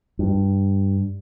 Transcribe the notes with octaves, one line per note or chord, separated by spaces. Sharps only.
G2